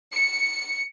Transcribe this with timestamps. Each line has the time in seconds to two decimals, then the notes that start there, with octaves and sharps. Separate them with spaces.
0.13 C#7